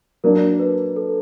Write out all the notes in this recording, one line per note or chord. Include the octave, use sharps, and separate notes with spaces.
F#3 A#3 D4 A#4
B4
A4